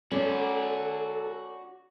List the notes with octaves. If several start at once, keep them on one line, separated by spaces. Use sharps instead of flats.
C#4 F#4 A4 D5